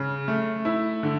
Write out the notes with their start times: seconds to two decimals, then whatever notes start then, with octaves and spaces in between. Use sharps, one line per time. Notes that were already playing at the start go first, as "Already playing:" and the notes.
Already playing: C#3
0.28 A3
0.65 E4
1.03 D3